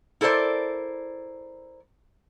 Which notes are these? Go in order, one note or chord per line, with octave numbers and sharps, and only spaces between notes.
E4 A4 A#4 C5 D5